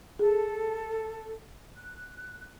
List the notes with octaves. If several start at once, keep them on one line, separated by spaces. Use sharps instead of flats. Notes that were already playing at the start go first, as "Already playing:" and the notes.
G#4 A4
F#6